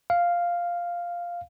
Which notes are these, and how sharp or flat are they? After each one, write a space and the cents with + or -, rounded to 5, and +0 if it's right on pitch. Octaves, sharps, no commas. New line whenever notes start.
F5 +0